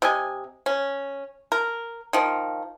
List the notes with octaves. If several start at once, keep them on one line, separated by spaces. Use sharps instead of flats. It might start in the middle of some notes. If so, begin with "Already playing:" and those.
C3 D#5 G#5
C#4
A#4
D#3 F3